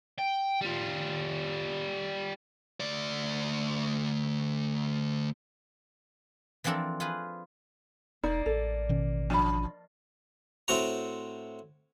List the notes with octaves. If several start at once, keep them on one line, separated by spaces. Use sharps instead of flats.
G5
G3 F4
D2 D5
E3 F3 C4 D4 A4 A#4
F4 G#4 B4
E1 A#3 D#4 D5
A1 A4
B2 D#3 C#4
F3 D4 B5
A2 C4 F#4 A#5